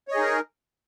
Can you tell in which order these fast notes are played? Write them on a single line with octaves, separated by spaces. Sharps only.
C#5 D#5 G#4 D#4 A#4